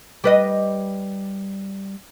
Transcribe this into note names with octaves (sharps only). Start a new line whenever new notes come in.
G3 B4 D#5